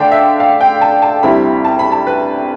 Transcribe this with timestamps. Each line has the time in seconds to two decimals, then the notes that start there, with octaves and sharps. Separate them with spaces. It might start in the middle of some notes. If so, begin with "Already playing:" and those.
Already playing: D3 A3 D4 F5 G5 A5
0.12 E5
0.40 F5
0.61 G5
0.81 A5
1.02 A5
1.23 D2 C3 G3 C4 E4 B5
1.65 A5
1.79 B5
1.92 A5
2.07 B4